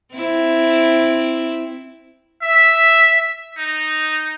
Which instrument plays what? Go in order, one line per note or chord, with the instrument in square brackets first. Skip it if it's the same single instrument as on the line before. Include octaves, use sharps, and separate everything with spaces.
[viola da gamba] C4 E4
[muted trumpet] E5
D#4